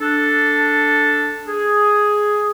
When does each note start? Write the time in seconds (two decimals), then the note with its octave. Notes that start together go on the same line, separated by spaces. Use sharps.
0.01 D4 A4
1.48 G#4